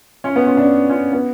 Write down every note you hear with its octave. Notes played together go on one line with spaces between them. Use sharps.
C#4
B3
C#4
D4
C#4
B3